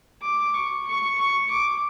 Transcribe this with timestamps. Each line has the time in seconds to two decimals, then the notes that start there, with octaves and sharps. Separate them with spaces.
0.22 D6
0.54 C#6
0.87 C#6
1.18 C#6
1.51 D6